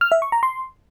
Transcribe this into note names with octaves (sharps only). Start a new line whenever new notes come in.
F6
E5
C#6
A#5
C6